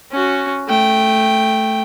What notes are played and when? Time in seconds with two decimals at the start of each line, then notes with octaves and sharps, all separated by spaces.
0.11 C#4 F#4
0.68 A3 G5